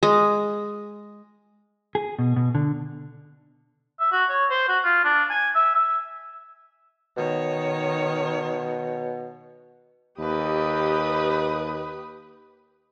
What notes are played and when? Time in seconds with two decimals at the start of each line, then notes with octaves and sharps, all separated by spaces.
0.03 G#3
1.95 G#4
2.19 B2
2.36 B2
2.55 D3
4.00 E5
4.12 F#4
4.29 C#5
4.50 C5
4.68 F#4
4.85 F4
5.05 D4
5.30 G#5
5.55 E5
5.75 E5
7.17 B2 D#3 C#5
10.20 D#2 G4 B4 D#6